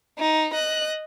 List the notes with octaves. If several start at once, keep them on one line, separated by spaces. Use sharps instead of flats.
D#4
D#5 F#6